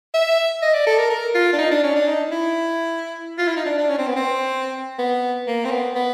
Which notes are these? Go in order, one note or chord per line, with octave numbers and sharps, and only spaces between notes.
E5
D#5
D5
A4
A#4
A#4
F4
D4
D#4
D4
C#4
D4
D#4
E4
F4
E4
D#4
D4
D4
C#4
C4
B3
C4
B3
A#3
C4
B3
B3